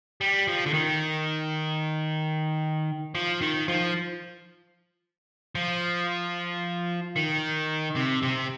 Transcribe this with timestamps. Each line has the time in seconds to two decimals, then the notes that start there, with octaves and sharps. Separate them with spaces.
0.21 G3
0.48 F3
0.66 D3
0.73 D#3
3.15 F3
3.41 D#3
3.68 F3
5.55 F3
7.16 D#3
7.96 C3
8.23 C3